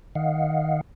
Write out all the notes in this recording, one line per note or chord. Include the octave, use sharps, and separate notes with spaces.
D#3 D#5 F5 F#5